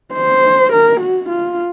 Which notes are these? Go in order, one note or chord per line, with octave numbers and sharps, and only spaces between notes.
C5
A#4
F#4
F4